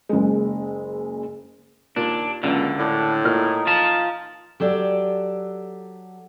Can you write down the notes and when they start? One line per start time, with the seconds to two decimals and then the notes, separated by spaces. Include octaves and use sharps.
0.09 F#1 G#3
1.96 D#2 A#2 D4
2.43 C#2 F#2 A#2 D3
2.79 A2 D4
3.25 A#2 D#4 F6
3.67 F4 A5
4.60 F#3 G4 A4 D5